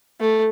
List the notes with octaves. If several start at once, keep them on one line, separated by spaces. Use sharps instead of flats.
A3